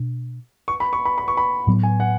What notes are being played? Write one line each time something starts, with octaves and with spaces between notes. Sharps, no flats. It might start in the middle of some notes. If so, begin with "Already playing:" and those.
Already playing: B2 D4
C#6
B5
C#6
B5
B5
C#6
B5
A2 F#3 B3
G#5
F#5